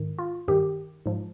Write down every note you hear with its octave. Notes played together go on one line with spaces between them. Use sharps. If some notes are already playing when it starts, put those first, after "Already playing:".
Already playing: G#2 D#3
F4
G2 D#3 G4
G#2 F3